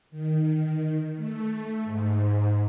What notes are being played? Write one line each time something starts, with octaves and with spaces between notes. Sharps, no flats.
D#3
A3
G#2